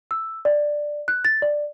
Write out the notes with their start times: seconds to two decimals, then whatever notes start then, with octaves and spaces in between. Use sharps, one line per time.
0.11 E6
0.45 D5
1.08 F#6
1.25 A6
1.42 D5